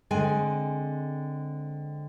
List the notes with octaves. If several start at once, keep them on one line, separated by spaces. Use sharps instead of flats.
D3 G#3 C4 G#4 G#5